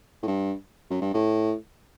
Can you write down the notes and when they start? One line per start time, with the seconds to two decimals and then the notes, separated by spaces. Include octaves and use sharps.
0.23 A2
0.28 G2
0.90 F#2
1.02 G2
1.14 A2